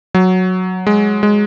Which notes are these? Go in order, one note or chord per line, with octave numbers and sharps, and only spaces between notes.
F#3
G#3
G#3